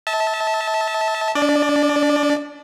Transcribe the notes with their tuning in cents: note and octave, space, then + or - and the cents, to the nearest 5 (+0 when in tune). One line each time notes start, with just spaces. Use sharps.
E5 -35 A5 +0
D4 -30 D5 +20